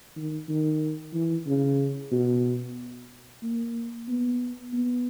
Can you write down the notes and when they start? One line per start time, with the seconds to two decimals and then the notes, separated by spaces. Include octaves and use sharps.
0.16 D#3
0.49 D#3
1.14 E3
1.46 C#3
2.12 B2
3.43 A#3
4.08 B3
4.73 B3